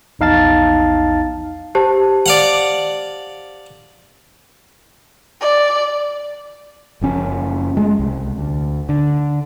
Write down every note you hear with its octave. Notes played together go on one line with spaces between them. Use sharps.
A#1 E2 D#4 F5 A5 A6
G4 C5 A5
D5 F5 F#5
D5
F#1 F3 C#4
G#3 A3
C2
D2
D3